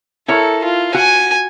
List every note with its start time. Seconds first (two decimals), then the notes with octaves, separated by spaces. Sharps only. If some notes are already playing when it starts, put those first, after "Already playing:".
0.28 E4 A4 A#4 C#5
0.64 F4
0.94 F#4 G#5